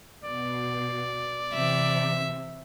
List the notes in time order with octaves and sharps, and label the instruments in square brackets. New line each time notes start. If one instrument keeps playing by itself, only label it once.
[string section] B2 [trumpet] D5
[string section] C3 E3 [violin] E5